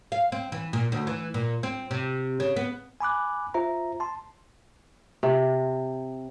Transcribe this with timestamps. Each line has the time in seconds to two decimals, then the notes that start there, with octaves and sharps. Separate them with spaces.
0.12 F5
0.32 C4
0.52 E3
0.73 A#2
0.92 D2
1.07 E3
1.34 A#2
1.63 C4
1.91 C3
2.40 C#3
2.56 B3
3.01 G#5 B5 D6 F#6
3.54 F4 C5 E5 A#5
4.00 A5 C6
5.23 C3